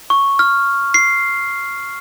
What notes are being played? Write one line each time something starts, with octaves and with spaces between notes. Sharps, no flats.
C#6
F6
C7